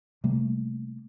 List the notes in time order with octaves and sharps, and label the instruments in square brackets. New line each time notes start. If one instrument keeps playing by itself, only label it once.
[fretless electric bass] C3 G3 A3 A#3